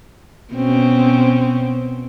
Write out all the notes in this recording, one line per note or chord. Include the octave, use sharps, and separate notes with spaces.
B2 C4 C#4